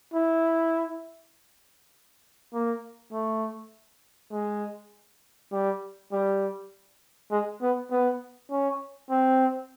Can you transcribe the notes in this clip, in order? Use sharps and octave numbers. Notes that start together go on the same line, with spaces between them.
E4
A#3
A3
G#3
G3
G3
G#3
B3
B3
C#4
C4